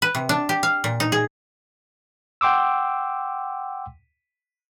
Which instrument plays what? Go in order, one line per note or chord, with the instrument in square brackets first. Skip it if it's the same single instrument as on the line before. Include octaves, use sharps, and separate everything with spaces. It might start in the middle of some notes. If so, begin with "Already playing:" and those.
[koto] B4
C3
D4
G4
F5
A#2
D#4
G#4
[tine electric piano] F#5 G5 C6 D6 E6